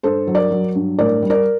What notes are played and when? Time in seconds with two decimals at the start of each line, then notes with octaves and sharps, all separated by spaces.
0.03 G2 A4 C5
0.27 F#3
0.35 A#4 D5
0.51 F#3
0.75 G2
0.99 A2 A#4 D5
1.22 G3
1.30 A#4 D5